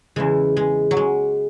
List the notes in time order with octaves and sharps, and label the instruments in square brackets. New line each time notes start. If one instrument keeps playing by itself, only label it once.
[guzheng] E2 C#3 E3 G#3
G#3
F#3
G#3